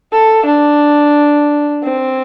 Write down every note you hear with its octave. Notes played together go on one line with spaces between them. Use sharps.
A4
D4
C4